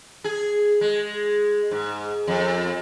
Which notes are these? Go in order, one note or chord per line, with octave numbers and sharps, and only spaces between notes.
G#4
G#3
G#2
F2